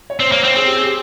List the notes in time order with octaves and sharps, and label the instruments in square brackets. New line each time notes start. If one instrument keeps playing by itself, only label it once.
[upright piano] C#5
[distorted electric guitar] C4 [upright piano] C5
[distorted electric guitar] A#3 [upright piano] C#5
[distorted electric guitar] C4 [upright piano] C5
[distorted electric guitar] C4 [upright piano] G#4
[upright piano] G4
G#4
G4